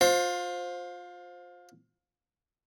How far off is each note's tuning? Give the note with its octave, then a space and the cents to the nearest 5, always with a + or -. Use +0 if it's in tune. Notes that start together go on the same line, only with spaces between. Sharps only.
F4 +25 C5 +5